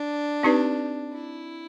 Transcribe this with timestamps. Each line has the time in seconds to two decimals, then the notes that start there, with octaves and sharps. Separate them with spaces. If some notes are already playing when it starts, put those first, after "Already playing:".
Already playing: D4
0.43 C4 D#4 G4 B4 D5
1.13 E4